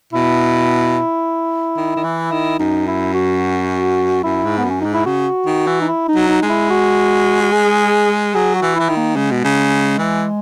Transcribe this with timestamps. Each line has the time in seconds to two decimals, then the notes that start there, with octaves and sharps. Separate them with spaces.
0.13 B2 E4
1.77 D#3
1.96 D#3
2.04 E3
2.31 D#3
2.59 F#2 D#4
2.87 E4
3.14 F#4
4.23 F#2 E4
4.44 G#2
4.57 B3
4.64 F#2
4.70 C#4
4.81 G#2 D#4
4.94 E4
5.06 C#3 F#4
5.46 D#3
5.67 E3
5.81 D#4
5.88 E4
6.08 D#4
6.15 F#3
6.28 D#4
6.43 G#3 D#4
6.49 E4
6.70 F#4
7.42 F#4
7.52 G#4
8.34 F#3 G#4
8.55 F#4
8.62 E3
8.76 E3 E4
8.89 D#3
8.96 A#3
9.16 C#3 G#3
9.31 B2
9.44 C#3
9.98 E3